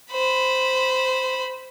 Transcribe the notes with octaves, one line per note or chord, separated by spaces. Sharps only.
C5 B5